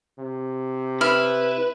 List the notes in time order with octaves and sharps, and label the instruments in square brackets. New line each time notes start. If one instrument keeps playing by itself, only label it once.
[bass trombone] C3
[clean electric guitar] E4 [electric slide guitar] B4 [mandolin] F6